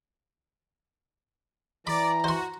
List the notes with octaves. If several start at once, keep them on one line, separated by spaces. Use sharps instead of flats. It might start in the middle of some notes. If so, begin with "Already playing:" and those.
E3 D5 A#5 B5
F#4 C5 C6